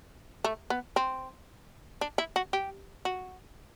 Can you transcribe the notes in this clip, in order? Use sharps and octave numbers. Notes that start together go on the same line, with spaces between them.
A3
B3
C4
D4
E4
F#4
G4
F#4